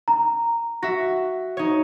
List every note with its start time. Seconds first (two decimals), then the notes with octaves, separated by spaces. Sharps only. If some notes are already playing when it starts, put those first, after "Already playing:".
0.08 A#5
0.83 F#4 E5 A#6
1.57 D#4 C#5